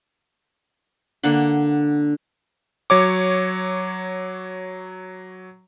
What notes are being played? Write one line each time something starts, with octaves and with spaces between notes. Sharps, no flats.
D3 A#3 D4 F#5
F#3 C#5 D6